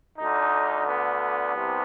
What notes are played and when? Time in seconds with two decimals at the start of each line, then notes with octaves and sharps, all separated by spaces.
0.18 D2 D3 D#4
0.86 B3
1.53 C2 C3